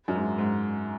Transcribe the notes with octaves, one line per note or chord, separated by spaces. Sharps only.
F#2
G#2
G#2